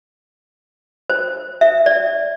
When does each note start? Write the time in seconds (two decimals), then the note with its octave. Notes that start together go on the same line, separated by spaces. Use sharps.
1.10 C5
1.61 E5
1.86 D5